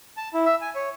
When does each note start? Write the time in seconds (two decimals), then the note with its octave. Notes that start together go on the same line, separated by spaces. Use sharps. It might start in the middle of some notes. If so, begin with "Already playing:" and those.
0.17 A5
0.34 E4
0.45 E5
0.61 G#5
0.75 C#5